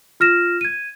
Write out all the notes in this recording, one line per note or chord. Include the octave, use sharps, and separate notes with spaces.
F4 F6 A#6 E7
G#6 D#7